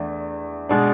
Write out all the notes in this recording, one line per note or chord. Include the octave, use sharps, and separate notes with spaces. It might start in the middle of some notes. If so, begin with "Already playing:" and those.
Already playing: E2 A3 D4
B2 G#3 D4